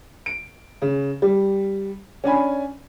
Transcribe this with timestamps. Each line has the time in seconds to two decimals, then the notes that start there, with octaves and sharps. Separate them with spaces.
0.26 D7
0.82 C#3
1.22 G3
2.24 C#4 D4 G#5 B5